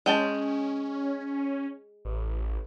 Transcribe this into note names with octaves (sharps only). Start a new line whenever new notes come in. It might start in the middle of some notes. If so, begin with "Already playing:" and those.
G#3 C#4 G5 A5
A1